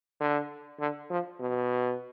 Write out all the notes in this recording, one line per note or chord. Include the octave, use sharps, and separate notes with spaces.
D3
D3
F3
B2